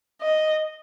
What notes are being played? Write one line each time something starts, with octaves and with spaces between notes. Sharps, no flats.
D#5